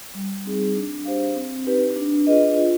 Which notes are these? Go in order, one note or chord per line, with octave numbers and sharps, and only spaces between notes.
G3
C4 D#4 G#4
D4
G4 C5 F5
C4
D#4 G4 B4
D4
F4 G#4 B4 D#5
F4